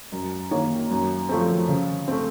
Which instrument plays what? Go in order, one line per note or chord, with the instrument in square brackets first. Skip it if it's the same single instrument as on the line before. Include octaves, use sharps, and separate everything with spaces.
[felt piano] F#2
D#3 A#3 C#5
F#2
F3 A3 C4
C#3
A3 C4